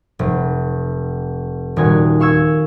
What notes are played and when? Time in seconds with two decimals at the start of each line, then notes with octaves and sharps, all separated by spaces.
0.19 F1
1.76 D#1 D#4 F#4 G#5
2.20 F5 C#6 E6 G#6